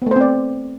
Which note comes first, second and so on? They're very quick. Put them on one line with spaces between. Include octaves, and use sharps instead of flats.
B3 A3 C5 C4 D5